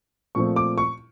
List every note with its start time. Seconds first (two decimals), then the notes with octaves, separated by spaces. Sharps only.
0.35 A#2 F3 A3 C4 C#6
0.56 D6
0.78 C#6